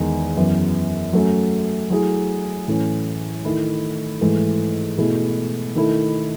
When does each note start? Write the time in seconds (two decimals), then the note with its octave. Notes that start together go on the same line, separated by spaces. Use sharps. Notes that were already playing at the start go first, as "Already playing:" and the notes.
Already playing: E2 D#3 G#3
0.36 F#2 E3 B3
1.13 F#3 A3 C#4
1.90 F#3 A3 E4 G#4
2.68 A2 E3 A3 C#4
3.45 D#3 A3 E4
4.21 G#2 E3 A3
4.98 B2 A3 E4 G#4
5.75 D#3 A3 E4 A4